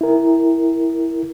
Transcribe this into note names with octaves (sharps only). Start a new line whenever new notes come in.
E4 A#4